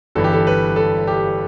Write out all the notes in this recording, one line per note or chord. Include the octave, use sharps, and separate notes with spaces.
G1 G2 E3 A4
G4
A4
B4
A4
G4